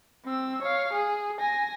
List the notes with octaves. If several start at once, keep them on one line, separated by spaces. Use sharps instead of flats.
C4 E6
C#5 F5
G#4
G#5 A#6